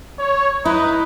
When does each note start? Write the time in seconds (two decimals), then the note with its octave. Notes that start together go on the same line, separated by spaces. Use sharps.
0.19 C#5
0.65 D#4 E4 B4